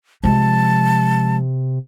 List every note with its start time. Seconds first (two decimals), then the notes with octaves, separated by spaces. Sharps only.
0.24 C3 F3 G#3 A5